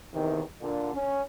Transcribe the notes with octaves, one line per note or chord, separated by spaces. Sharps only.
E2 C3 D#3
A#2 D3
C#4